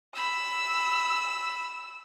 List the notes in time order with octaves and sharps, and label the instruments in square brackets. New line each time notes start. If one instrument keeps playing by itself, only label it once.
[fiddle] B5 [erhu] E6